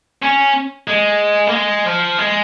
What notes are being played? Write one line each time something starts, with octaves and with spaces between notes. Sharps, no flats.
C#4
G#3
A#3
G#3
F3
G#3